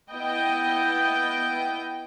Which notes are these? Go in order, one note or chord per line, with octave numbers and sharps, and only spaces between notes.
B3 E4 D#5 G5